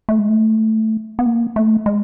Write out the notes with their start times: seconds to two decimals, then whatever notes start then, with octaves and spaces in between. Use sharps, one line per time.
0.09 A3
0.19 G#3
0.29 A3
1.19 B3
1.26 A#3
1.56 A3
1.86 G#3